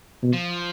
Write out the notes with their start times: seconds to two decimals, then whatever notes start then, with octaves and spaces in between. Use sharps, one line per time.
0.23 B2
0.33 F3